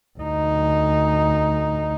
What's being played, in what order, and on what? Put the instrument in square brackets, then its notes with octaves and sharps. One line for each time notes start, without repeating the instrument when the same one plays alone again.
[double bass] D2 D#4